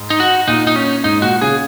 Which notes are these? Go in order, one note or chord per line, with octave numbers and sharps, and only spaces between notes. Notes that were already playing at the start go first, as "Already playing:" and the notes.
Already playing: G#2
D#4
F#4
A#2 D#4
D#4
C#4
G#2 D#4
A#2 F#4
C#3 G#4